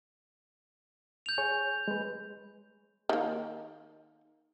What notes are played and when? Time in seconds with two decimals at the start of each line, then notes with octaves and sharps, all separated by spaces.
1.26 G6 F7
1.38 G#4 C#5 G#5
1.88 G#3 B4
3.09 D#3 A#3